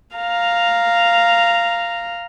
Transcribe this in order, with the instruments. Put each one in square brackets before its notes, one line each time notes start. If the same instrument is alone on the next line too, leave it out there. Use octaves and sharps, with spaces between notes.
[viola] F5 A#5